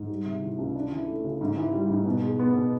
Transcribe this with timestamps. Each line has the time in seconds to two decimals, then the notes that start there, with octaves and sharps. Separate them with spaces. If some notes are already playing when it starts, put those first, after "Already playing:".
Already playing: G#2
0.09 G3
0.25 C3
0.42 E3
0.58 C#2
0.75 D4
0.92 E3
1.07 A3
1.24 C#3
1.41 G#2
1.57 E3
1.73 G3
1.90 G#2
2.06 B2
2.23 G#3
2.39 B3
2.55 B2